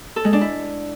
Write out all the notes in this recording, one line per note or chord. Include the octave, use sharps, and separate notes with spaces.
A4
G#3
D4
E4